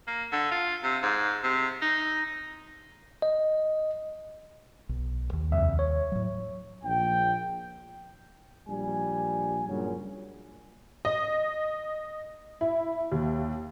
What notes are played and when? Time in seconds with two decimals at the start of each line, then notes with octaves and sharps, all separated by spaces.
0.07 A#3
0.32 D3
0.52 F4
0.83 C3
1.03 G#2
1.43 C3
1.82 D#4
3.22 D#5
4.89 B1
5.33 D#2
5.51 C2 F2 E5
5.79 C#5
6.12 A2 F#3
6.84 A#1 G5
8.69 A#1 G3 G#5
9.68 G2 A#2 C#3 F#3
11.05 D#5
12.61 E4
13.12 D#2